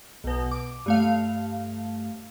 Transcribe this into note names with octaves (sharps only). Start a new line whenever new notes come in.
B1 B2
D6
G2 A3 F5